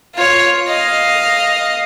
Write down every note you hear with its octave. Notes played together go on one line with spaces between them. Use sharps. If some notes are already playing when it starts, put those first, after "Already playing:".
F4 C#5
D#5 F5